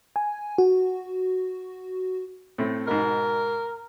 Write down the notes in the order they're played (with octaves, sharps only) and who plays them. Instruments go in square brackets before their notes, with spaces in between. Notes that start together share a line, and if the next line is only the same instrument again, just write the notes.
[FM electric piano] G#5
F#4
[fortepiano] A2 A3 C4
[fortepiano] G#2 B2 [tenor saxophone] A#4